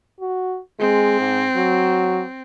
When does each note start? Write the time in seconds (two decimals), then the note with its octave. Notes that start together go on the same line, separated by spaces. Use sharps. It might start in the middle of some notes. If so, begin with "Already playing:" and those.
0.20 F#4
0.80 G#3 C4
1.20 G#2
1.56 F#3